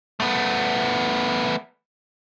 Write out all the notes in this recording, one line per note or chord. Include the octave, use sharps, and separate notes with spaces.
A3 B3